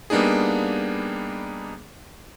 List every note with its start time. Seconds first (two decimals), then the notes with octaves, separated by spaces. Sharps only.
0.10 G3 A#3 B3 D4 D#4 G#4